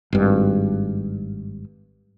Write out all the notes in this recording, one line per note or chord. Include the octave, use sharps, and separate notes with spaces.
G#1 G2